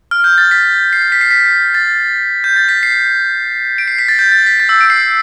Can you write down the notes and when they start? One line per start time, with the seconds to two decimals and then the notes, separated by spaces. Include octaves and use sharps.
0.11 F6
0.24 G6
0.38 A6
0.51 B6
0.93 C7
1.12 B6
1.21 C7
1.31 B6
1.74 A6
2.44 G6
2.56 A6
2.69 B6
2.83 C7
3.78 D7
3.88 C7
3.99 B6
4.08 A6
4.19 G6
4.32 A6
4.47 B6
4.60 A6
4.69 E6
4.81 D7
4.90 C7